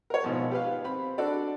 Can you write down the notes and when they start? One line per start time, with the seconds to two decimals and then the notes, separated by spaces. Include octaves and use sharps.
0.10 A#4 C#5
0.24 G#1 B2 F3
0.51 G4 B4 F5
0.84 C4 B5
1.18 D4 F#4 A4 D5